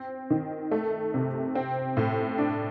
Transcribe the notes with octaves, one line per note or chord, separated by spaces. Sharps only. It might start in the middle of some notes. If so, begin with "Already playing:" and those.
Already playing: C4
D#3
A3
C3
C4
A2
D4